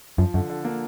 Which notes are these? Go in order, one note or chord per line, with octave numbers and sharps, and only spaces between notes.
F#2 F3
F#2 D3
D3
A#3